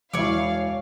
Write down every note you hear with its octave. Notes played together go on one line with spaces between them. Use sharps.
E1 E4 C#5 D5 F5